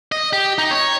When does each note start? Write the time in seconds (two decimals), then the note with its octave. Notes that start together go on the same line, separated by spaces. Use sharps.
0.12 D#5
0.33 G4
0.58 D#4
0.71 C#5